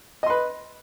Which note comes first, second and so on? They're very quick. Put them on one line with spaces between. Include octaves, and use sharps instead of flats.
D#5 C6 B4